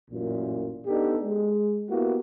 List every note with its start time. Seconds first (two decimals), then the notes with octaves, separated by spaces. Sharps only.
0.11 A1 F#2 A#2
0.86 B3 D4 D#4 G4 A4
1.22 G#3
1.89 A#3 B3 E4 F#4 G4